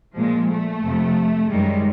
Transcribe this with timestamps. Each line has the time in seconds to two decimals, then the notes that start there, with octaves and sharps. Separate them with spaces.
0.16 A#2 F3 G#3
0.49 A3
0.83 F2 C3 F3
1.51 F#2 D#3 G3 G#3